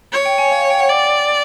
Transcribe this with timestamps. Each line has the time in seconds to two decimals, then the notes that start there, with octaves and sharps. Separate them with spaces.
0.13 C#5
0.25 G5
0.38 G#5
0.51 F5
0.61 F5
0.70 G5
0.80 F#5
0.89 D5